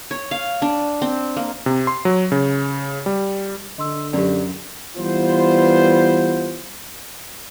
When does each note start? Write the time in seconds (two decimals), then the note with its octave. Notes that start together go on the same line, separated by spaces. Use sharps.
0.11 C#5
0.31 F5
0.62 D4
1.02 C4
1.37 A#3
1.66 C3
1.87 C6
2.05 F#3
2.32 C#3
3.06 G3
3.78 D3 D#5 C6 E6
4.13 F#2 G4 D5
4.97 E3 G3 B3 F4 C5